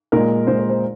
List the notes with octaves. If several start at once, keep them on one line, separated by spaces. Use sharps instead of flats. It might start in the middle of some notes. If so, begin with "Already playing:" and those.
A#2 G#3 A#4
A#2 G#3 C5
C5
C5